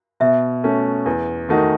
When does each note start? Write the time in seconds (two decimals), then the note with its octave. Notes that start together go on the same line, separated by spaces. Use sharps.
0.20 B2 E5
0.64 A3 C#4
1.06 E2
1.49 D#3 A3 D#4 F#4